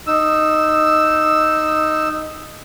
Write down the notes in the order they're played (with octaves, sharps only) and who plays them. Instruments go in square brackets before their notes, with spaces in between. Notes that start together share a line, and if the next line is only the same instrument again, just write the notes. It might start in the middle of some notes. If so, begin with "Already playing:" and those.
[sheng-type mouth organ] D#4 E6